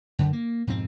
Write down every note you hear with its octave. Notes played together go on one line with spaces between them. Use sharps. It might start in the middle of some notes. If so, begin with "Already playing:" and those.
F#2 D3
A#3
F2 G#2 B2 C4